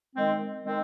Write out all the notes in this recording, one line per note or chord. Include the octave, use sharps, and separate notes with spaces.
D#3 G#3 C4
D#3 G#3 C4